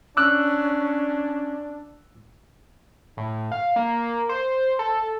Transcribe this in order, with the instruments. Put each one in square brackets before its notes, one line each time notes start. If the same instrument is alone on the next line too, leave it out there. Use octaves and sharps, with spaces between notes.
[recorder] C#4 [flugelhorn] D4 [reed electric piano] D6 E6 F#6
[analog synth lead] A2
F5
A#3
C5
A4